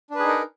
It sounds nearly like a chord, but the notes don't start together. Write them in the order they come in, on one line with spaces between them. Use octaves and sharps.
D4 B4 G#4 D#4 A#4